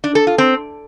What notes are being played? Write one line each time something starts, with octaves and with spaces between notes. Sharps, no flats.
D4
A4
F4
C4